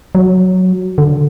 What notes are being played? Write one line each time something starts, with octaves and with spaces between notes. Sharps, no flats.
F#3
D3